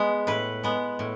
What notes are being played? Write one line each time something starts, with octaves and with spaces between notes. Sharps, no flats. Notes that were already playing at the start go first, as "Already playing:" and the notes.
Already playing: G#3 B3 G#4
A2 B4
G#3 B3
A2